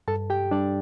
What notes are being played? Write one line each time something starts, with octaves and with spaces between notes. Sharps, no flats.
G2 A4 A5
G4 G5
G3 D4 D5